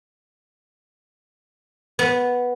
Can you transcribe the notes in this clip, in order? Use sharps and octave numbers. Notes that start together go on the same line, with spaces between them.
B3